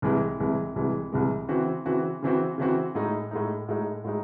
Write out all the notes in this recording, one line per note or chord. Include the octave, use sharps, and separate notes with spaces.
C2 C3 E3 G#3
C2 C3 E3 G#3
C2 C3 E3 G#3
C2 C3 E3 G#3
C#3 E3 C4 F#4
C#3 E3 C4 F#4
C#3 E3 C4 F#4
C#3 E3 C4 F#4
A2 G#3 D#4
A2 G#3 D#4
A2 G#3 D#4
A2 G#3 D#4